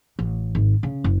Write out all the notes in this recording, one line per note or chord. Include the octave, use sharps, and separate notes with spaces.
A1
G#1
C#3
F#1